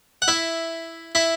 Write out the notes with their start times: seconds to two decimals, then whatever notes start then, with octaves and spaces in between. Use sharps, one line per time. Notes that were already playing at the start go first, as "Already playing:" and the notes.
0.22 F#5
0.28 E4 E5
1.15 E4 E5